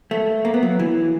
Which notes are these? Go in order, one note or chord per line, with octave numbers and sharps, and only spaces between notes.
A3
A#3
B3
F#3
E3